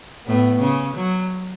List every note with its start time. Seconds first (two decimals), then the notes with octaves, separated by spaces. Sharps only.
0.27 A2 B3
0.60 C#3
0.96 F#3